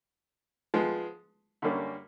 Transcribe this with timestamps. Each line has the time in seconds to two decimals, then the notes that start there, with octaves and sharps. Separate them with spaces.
0.74 F3 G#3 B3
1.62 F#2 D3 G3 A#3 C#4